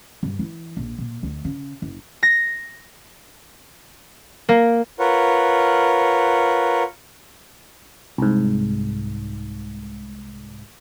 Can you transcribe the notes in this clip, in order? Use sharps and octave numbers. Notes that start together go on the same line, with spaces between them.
G2
E3
A#1
A#2
D2
C#3
F#1
A#6
A#3
F4 A#4 B4 C#5 F#5
C2 G#2